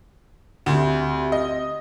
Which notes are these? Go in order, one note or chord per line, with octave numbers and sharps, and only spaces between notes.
D2 C4 G4 E5
D#5